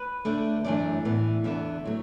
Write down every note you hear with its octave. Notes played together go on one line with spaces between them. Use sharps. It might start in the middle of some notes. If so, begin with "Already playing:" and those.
Already playing: B4
D3 A3 D4
F#2 E3 A3 D4 D5
A2 E3 B3
E2 D3 B3 E5
F#3 A3